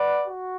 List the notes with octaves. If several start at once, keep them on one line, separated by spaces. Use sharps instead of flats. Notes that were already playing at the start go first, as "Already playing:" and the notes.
Already playing: B4 D5 F#5
F#4